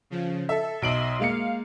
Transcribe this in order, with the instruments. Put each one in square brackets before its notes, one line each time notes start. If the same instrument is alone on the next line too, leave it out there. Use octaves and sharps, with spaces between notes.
[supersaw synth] C#3 F3
[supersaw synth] A4 [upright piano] E5
[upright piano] B1 D7 F#7 [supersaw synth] D#5 E5 C6
[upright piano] G#3 A#3 C#7 [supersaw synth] F5